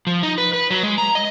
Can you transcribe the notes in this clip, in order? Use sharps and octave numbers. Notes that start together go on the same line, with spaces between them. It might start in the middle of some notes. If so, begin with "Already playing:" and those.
F3
D#4
B4
B4
F#3
G#3
A#5
D#5